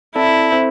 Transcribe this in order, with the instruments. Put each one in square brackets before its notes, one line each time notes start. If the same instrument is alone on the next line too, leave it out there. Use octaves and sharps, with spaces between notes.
[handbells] C4 A4 D5 A5 [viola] E4
[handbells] C4 A4 C5 E5